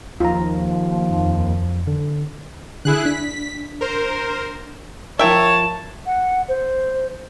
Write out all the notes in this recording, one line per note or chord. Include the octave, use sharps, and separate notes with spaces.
D#2 F3 F4 A#5
F2
D3
D3 E4 G#4 F#6
D4 B6
A#4 C5
F3 F4 A#4 C#5 E5 G5 A5
F#5
C5